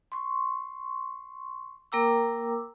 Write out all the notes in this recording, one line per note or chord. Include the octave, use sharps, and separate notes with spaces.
C6 C#6
A#3 A#4 G5 A#5 D6 E6